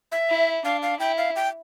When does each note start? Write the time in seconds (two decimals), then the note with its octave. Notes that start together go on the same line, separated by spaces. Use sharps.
0.12 E5
0.29 E4
0.65 D4 F5
0.82 F5
0.99 E4 G5
1.17 F5
1.36 G5